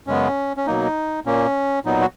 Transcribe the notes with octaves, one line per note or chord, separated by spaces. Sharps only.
F#2 C#3 G#3 B3 C#4
C#4
B2 F#3 A#3 D#4
A#2 A#3 C#4
A#2 F#3 B3 D#4
F#4